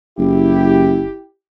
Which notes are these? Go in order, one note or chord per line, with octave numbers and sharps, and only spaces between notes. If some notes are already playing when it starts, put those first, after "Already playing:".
F#1 E4 G4